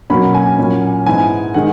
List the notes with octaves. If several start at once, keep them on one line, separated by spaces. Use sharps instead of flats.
B2 F#3 A#3 C#4 B5
G#5
A#2 F#3 A#3 C#4
G#2 E3 B3 G#5
D#3 G#3 F#5